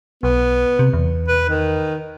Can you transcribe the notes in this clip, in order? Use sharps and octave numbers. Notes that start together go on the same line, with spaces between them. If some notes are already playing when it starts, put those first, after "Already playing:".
B1 B3
C3
E2
B4
D#3